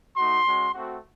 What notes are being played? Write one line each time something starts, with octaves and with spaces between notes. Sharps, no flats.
A3 D#4 F#4 C6
G#3 C#4 F#4
A3 C4 F#4